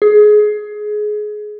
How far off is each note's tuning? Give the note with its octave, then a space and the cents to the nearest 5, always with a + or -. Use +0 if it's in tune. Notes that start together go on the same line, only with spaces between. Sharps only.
G#4 +20